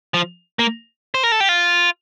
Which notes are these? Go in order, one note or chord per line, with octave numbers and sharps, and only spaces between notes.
F3
A#3
C5
A#4
A4
G4
F4